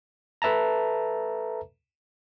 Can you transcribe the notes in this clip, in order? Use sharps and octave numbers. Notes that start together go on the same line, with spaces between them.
A4 B4 E5 A5 A#5